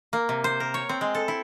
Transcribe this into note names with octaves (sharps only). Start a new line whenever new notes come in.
A#3
C3
C5
A#4
C#5
C4
G#3
A4
E4